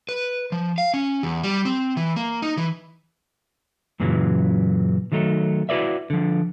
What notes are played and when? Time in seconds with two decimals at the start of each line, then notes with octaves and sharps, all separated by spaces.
0.09 B4
0.52 F3
0.78 F5
0.94 C#4
1.23 E2
1.43 G3
1.65 C4
1.97 E3
2.16 A#3
2.42 D#4
2.57 E3
4.00 F#2 A#2 C#3 E3 F#3
5.12 D#3 F#3 A3 D#4
5.69 E4 F#4 A4 B4 D5 E5
6.10 D3 F3